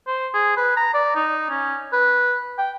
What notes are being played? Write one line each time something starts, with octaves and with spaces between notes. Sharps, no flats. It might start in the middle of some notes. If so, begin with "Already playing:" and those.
C5
G#4
B4
A#5
D5
D#4
C#4
B4
G5